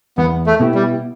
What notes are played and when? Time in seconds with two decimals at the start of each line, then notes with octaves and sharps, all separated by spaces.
0.18 E2 B3
0.46 A3
0.60 B2 B3 E4 G4
0.75 G3